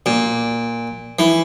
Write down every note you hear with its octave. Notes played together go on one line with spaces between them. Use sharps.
A#2
E3